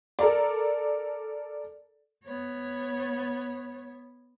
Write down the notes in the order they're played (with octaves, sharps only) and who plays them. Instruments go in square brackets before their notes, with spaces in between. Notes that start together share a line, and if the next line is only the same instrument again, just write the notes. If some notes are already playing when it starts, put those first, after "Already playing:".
[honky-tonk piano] A4 A#4 D5
[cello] B3 C#5